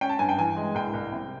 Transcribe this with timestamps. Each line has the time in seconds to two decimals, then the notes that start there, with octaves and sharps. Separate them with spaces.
0.01 C#4 G5
0.09 A5
0.19 G2 G#5
0.29 G5
0.38 E3 G#5
0.57 G#3
0.75 C2 G5
0.94 C2
1.13 C3